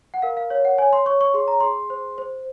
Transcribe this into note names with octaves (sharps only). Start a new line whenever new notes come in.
F#5
A#4 F5
F5
C#5 F5
F#5
C#5 G#5
C6
C#5 C#6
C#6
G#4 C6
A#5
G#4 C6
C5
C5